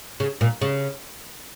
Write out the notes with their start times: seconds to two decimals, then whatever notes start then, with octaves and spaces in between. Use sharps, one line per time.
0.20 C#3
0.41 A#2
0.62 C#3